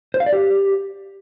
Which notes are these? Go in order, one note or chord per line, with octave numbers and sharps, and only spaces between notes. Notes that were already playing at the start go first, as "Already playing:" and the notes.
C5
F5
D5
G4